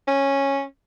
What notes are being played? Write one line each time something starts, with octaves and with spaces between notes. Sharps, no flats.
C#4